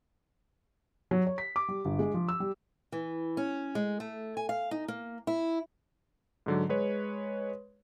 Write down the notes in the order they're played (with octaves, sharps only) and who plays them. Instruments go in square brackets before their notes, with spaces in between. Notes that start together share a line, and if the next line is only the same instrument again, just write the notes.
[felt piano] F#3
C#5
B6
D6
G3
G1
G#3
F3
E6
G3
[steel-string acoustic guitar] E3
C#4
G#3
A3
G#5
F5
D#4
A#3
E4
[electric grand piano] G#2 D3 F#3
G#3 B4 C#5